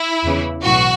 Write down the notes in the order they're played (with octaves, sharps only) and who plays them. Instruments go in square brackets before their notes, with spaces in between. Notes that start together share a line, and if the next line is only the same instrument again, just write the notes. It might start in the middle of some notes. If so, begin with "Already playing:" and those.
Already playing: [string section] E4
E2 C#3 E3
B1 A2 E3 F#4